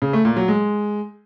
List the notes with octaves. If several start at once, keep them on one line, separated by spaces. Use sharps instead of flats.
C#3
A3
A#2
F#3
G#3